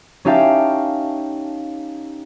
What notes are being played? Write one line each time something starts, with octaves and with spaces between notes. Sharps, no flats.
C#4 D#4 G4 E5 F5 A5